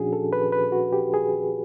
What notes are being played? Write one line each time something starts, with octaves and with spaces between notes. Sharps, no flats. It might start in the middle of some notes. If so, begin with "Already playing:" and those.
Already playing: A#2 F3 C#4 D4 F#4 G#4
A4
B4
B4
F#4
G4
G#4